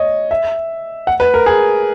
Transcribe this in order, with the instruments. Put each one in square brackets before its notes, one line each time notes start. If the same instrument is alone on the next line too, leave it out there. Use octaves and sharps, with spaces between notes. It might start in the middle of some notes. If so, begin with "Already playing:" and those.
Already playing: [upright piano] C#5 D#5
E5
F#5
B4
A#4
G#4